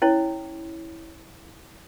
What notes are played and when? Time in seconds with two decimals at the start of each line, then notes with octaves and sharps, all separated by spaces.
0.02 C#4 E4 C#5